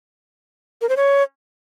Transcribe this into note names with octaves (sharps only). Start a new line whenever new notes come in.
A#4
C5
C#5